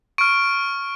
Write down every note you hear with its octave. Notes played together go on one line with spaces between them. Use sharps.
C#6 F6 D7